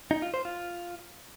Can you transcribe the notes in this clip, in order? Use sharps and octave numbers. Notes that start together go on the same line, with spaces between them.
D#4
F4
C5
F4